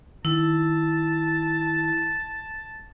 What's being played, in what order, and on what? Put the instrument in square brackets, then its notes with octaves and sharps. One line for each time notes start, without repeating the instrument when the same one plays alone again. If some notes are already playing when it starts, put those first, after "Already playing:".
[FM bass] D#3 [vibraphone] E4 [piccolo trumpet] A5